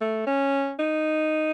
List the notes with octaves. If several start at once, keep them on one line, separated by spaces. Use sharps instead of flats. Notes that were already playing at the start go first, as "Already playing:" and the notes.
A3
C#4
D#4